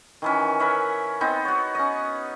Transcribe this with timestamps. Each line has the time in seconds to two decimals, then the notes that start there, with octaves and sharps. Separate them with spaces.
0.22 D#3 E3 C#4
0.60 A#4 B4 C#5 E5
1.21 B3 C4 D#4
1.45 F#4 C#5
1.75 C#4 D#5